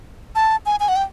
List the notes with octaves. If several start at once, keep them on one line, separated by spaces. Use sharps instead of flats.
A5
G#5
G#5
F#5
G5